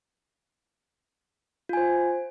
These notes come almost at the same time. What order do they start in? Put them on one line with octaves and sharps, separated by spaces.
F4 G#5 C5